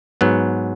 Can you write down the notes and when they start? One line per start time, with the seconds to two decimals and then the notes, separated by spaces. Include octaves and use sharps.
0.21 G#2 F#3 B3